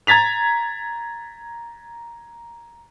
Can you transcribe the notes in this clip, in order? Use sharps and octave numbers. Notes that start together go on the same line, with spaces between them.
A#5 G#6 A6 B6 F7